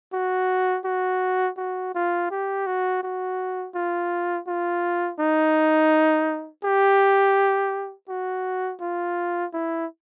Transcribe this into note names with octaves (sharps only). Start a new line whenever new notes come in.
F#4
F#4
F#4
F4
G4
F#4
F#4
F4
F4
D#4
G4
F#4
F4
E4